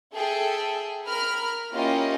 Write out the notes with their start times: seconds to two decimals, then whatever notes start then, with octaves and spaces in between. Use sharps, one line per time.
0.14 G#4 A4 E5 G5
1.07 A#4 B5 F6
1.72 A#3 C#4 E4 F4 G4 D#5